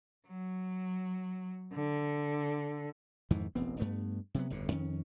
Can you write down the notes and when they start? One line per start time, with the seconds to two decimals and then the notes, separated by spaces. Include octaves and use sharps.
0.26 F#3
1.73 D3
3.30 F2 G#2 D#3 E3
3.55 E1 A1 B3 C4
3.79 G2 A3 B3
4.34 C3 F#3 B3
4.50 G1 F2 A2 D3
4.71 F2 D#3 C#4